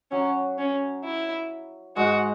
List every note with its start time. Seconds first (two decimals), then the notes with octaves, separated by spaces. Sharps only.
0.11 F#3 C#4
0.58 C#4
1.04 E4
1.96 G#2 G#3 F#4